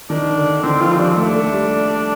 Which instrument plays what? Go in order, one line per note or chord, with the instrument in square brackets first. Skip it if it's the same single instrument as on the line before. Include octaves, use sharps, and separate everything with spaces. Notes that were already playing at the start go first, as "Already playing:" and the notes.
[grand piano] D#3 [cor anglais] D4
[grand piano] D3
[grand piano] D#3 [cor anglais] C4
[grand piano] F3 [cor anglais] F4
[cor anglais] C4
[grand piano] G3 [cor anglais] D4
[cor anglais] C4
[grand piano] A3 [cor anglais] D4
[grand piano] A3
G3